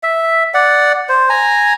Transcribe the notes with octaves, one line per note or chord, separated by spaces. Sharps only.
E5
D5 F#5
C5
G#5 A#5